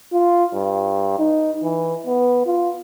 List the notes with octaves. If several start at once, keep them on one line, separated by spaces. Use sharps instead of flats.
F4
G2
D#4
E3
B3
F4